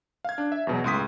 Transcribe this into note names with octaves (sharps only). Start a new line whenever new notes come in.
F5 G#6
D4
E5
E2 B2 F#3
C#2 A2 C6 D#6 B6